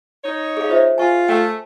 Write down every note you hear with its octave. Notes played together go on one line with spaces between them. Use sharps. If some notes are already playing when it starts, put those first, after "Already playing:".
D#4 C#5
G#4 F5
F4 C5 E5
F4 G#5 C#6
A3 G5